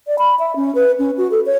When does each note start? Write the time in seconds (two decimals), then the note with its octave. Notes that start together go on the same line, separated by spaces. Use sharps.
0.07 D5
0.19 B5
0.39 E5
0.56 C#4
0.75 B4
0.99 C#4
1.18 F#4
1.31 A4
1.46 C#5